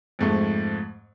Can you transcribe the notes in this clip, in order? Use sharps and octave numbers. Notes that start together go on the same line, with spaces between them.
F2 G#2 A3